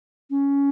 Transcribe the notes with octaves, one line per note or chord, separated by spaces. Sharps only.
C#4